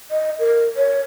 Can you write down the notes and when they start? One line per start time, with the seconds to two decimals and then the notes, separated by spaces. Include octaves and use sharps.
0.11 D#5
0.39 A#4
0.77 C#5